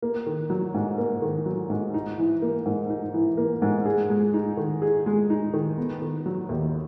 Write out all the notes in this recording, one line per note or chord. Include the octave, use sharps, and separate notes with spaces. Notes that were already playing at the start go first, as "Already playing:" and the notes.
A#3
D#3
F#3
G#2
A#3
D#3
F#3
G#2
D#4
E3
A#3
G#2
D#4
E3
A#3
G#2
G#4
G#3
D#4
D#3
G#4
G#3
D#4
D#3
B3
D#3
F#3
D#2